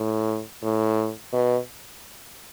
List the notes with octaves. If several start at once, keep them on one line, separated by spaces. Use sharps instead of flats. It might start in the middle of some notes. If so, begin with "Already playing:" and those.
Already playing: A2
A2
B2